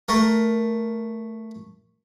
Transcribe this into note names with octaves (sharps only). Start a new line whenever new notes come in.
A3 A#4